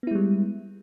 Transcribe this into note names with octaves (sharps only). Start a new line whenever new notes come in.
G3 G#3 B3 E4